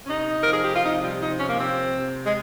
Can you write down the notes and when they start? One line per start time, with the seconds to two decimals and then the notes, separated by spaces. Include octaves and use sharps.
0.05 C#4
0.08 C3 D#4
0.43 F3 A#4
0.53 G#4
0.63 G4
0.74 F4
0.83 C3 D#4
1.03 G3
1.21 F3 D#4
1.39 C#4
1.48 A#3
1.58 C3 C4
1.95 C3
2.25 G#3